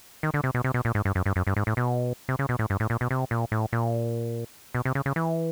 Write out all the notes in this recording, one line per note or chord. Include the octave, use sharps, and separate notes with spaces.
D#3
D3
C3
B2
C3
B2
A#2
G#2
G2
F#2
G2
F#2
G2
G#2
A2
B2
C3
C#3
B2
A2
G2
A2
A#2
B2
C3
A#2
A2
A#2
B2
C3
C#3
C#3
E3